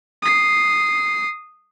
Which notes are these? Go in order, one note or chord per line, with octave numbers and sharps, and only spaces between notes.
D#6 C7